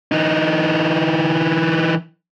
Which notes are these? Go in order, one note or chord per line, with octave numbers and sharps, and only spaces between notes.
E3 D#4